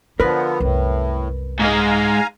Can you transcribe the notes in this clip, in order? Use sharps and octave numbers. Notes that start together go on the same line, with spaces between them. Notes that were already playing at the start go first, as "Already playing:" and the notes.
D3 F3 B3 F4 A#4 B4
C2 F#2 A2
G#2 G#3 F5 G#5 A#5